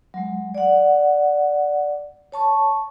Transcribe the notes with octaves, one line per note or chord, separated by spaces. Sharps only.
F#3 G#3
D5 F#5
C#5 A5 C#6